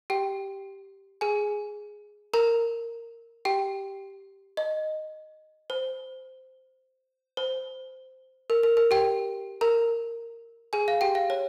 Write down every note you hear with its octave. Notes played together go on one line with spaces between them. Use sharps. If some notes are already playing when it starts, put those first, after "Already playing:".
G4 G5
G#4 G#5
A#4 A#5
G4 G5
D#5
C5
C5
A#4
A#4
A#4
G4 G5
A#4 A#5
G#4 G#5
F5
G4 G5
F5
C#5